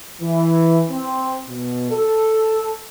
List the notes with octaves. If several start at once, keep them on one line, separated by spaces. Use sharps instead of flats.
E3
C4
B2
A4